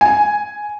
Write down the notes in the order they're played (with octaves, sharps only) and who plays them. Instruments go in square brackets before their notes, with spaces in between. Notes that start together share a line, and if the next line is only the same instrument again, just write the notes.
[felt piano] G#5